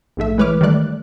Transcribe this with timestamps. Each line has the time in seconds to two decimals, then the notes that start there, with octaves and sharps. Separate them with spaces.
0.17 A#1 G#2 A3 E5
0.38 E3 G#3 B4 C#5 D6 F6
0.61 D#3 G3 A3 D5 F#6